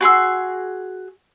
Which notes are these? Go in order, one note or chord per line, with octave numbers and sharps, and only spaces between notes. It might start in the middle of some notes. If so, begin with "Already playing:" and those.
F#4 G#4 C6 E6